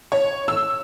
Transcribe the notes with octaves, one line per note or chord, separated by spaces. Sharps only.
C#5
E6